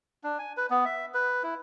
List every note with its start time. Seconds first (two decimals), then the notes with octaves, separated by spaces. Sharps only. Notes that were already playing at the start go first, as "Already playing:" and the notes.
0.24 D4
0.39 G#5
0.57 B4
0.70 B3
0.85 E5
1.14 B4
1.43 E4